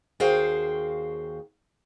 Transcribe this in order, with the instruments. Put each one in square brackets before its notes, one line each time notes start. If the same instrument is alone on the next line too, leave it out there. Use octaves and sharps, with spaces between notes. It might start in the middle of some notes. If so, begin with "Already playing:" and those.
[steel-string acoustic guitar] D#2 F#4 G#4 C5 F5 G5